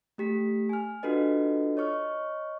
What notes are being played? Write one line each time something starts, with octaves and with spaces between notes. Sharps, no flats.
A3 G4 B6
G#5 F6
D4 F4 F#4 A4 B4 D#5
C#5 D#5 C#6 F6